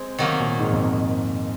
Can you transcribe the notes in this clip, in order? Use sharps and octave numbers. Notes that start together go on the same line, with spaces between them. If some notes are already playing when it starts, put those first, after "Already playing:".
Already playing: G#3 C4
C3 D#3 F#3 A#3
A#2
G#2
F2